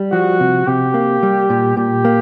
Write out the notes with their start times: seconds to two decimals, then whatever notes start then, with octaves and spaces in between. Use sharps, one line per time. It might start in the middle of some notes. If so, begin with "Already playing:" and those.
Already playing: G3
0.12 F3 F#4
0.40 C3
0.67 C3 G4
0.94 A#3
1.23 G3
1.50 A#2
1.77 A#2 G4
2.05 A#3